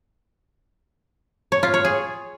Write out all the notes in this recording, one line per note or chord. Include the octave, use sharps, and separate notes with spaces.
C#5
F4
C#5
G#4